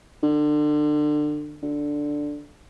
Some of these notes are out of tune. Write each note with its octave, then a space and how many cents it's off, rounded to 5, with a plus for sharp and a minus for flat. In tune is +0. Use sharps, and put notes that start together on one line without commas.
D3 +30
D3 +0